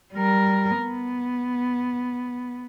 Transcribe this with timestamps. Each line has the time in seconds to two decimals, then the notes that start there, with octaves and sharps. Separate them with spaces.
0.14 G3 A#4
0.79 B3